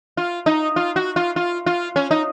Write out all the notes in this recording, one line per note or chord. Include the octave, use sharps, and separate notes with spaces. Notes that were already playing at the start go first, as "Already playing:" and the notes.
F4
D#4
F4
F#4
F4
F4
F4
C#4
D#4